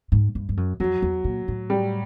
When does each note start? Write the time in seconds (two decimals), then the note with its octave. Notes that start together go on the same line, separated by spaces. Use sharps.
0.12 G#2
0.35 G2
0.49 G2
0.57 F#2
0.80 F2 F#3
1.02 E2
1.24 A#2
1.48 A2
1.70 G3